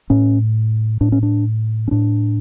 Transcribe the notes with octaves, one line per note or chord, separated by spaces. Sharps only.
A2 C#4
A2 D4
C#4
D4
C#4
A2 D4